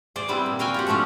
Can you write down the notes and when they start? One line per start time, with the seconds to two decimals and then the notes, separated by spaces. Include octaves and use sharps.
0.16 G#4 C5 D5
0.28 G3 B3 C4 E4 G#4
0.46 A#2
0.59 F#4 F5 G5 G#5
0.74 F4 G4 F#5
0.87 F3 A3 C#4 D4 F4